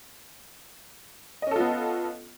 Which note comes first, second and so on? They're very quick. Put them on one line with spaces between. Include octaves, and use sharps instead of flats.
D#5 C#4 A4 F4 B3